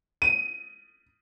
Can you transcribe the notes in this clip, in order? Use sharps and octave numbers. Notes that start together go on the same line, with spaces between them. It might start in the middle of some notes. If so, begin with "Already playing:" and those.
D#7